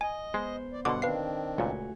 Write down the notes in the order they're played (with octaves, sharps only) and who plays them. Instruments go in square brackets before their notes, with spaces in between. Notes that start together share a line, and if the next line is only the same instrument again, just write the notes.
[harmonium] D#5 [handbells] G#5
[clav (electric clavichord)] G#3 [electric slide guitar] B3 C5
[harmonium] D5
[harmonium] G2 F#5 [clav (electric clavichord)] B2 D3 [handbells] C6 D6
[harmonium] D#3 C4 D4 [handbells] B4 F5 C7
[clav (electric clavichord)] C#2 A#2 [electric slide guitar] A3 F#4 G#5